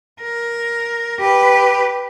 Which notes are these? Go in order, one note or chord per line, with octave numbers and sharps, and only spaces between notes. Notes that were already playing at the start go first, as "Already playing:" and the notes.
A#4
G4 B4